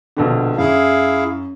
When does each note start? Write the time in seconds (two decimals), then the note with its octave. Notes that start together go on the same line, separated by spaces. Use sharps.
0.17 A#1 B2 D3
0.58 F#2 E4 G#4 F5